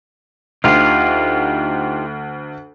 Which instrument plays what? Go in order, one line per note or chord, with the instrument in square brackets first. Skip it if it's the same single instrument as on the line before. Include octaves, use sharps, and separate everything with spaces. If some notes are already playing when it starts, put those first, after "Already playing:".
[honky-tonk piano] D2 [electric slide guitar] D#4 F4 G4 [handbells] F6 C7